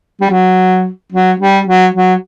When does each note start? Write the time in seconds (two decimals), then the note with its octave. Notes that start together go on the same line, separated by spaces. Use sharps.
0.21 G3
0.30 F#3
1.13 F#3
1.40 G3
1.67 F#3
1.95 F#3